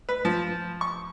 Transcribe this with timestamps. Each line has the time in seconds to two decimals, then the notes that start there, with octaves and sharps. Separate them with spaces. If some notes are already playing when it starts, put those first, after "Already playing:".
0.09 B4
0.25 F3
0.81 C#6